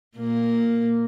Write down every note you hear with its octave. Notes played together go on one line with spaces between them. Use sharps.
A#2 A#3